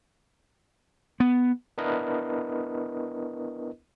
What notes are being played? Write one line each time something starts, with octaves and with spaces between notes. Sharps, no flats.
B3
B3 D4 E4 A#4 B4 D#5